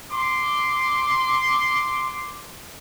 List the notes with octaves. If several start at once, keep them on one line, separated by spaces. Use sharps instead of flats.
C6 D6